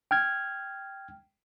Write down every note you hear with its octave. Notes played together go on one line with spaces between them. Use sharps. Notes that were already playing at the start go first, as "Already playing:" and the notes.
G5 F6 G#6